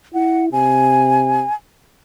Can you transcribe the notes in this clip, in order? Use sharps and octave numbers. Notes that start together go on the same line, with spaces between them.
E4 F#5
C3 G#5